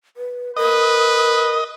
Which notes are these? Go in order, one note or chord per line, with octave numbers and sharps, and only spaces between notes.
B4
A#4 B4 D#5